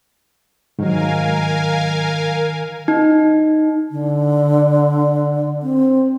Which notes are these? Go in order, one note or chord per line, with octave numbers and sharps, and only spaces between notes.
G#2 D#3 F#3 A#4 F5 G#5
D#4
D3
C4